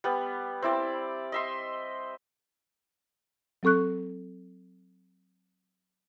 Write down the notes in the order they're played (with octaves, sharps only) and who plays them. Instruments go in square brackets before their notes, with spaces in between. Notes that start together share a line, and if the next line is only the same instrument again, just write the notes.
[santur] G3 B3
C4 E4 D5
D#5 E5 C6
[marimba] F#3 C4 A4 C#6 F#6